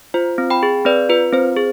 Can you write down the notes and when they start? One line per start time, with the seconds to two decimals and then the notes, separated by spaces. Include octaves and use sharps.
0.14 F4 C5
0.38 C4
0.50 G5 B5
0.63 G#4
0.85 C4 B4 D5
1.09 F4 B4
1.33 C4 C5
1.56 G#4